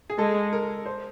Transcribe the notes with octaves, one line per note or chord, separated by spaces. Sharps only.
G#4
G#3 A4
A#4
C5